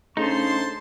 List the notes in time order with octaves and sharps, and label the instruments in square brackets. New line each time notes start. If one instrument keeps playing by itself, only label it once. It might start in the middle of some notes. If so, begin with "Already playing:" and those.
[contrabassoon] C#3 [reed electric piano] A3 D4 A4 [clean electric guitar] D#4 [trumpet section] C5 A5 C6